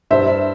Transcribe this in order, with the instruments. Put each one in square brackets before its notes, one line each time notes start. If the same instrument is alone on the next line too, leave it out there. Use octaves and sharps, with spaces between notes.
[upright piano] G2 C5 E5